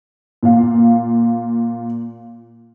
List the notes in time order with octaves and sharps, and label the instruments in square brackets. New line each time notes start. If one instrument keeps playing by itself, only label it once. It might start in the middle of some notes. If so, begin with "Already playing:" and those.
[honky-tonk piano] A#2 F5